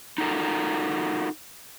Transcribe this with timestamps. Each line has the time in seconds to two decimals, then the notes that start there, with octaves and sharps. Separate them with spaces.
0.18 D#4 F4 F#4 A4 A#4